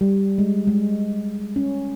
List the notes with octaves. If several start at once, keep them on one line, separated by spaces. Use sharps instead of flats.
G3
G#3
G#3
C#4